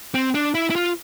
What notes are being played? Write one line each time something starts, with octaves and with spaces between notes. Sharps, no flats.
C4
D4
E4
E4
F4